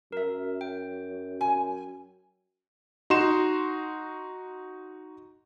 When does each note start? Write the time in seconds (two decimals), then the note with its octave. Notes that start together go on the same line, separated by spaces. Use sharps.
0.12 F#2 A#4 E5
0.61 G5
1.41 G#5
3.10 D#4 F#4 C6 E7